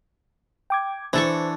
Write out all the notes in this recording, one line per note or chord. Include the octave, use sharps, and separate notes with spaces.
G5 D6 G#6
E3 D4 A4 C5 C#6